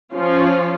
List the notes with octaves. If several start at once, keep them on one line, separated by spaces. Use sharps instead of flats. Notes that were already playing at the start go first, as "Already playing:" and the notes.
F3 C#4 F4